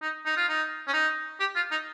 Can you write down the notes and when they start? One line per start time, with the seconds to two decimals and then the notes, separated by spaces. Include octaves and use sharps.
0.02 D#4
0.26 D#4
0.37 F4
0.49 D#4
0.88 C#4
0.94 D#4
1.40 G4
1.56 F4
1.71 D#4